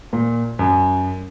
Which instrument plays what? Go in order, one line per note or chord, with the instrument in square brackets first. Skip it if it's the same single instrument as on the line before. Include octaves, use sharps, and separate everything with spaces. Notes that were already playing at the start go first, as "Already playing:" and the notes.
[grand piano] A#2
F#2